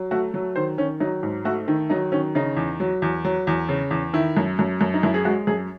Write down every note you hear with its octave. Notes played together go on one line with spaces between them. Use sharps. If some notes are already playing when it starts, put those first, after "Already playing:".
Already playing: F#3
A3 F#4
F#3
D#3 C5
D#3 C#4
F#3 D#4
G#2
A3 F#4
D#3 D#4
F#3 D#4
D#3 C#4
C#3 D#4
E2
F#3
E2
F#3
E2
C#3
E2
D#3 E4
F#2
F#2
F#2
D#4
F#2 E4
G#4
G#3 F#4
F#2 G#4